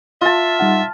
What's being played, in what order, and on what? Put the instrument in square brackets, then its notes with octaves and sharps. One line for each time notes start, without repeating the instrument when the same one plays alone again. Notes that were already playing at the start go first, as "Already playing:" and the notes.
[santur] F4 A5 [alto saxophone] E5
[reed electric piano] G3 D#4 F#5